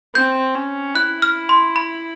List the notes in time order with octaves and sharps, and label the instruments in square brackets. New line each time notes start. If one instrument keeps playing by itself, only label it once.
[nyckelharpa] C4 [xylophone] G6
[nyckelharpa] C#4
[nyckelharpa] E4 [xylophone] F#6
[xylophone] F6
C6
B5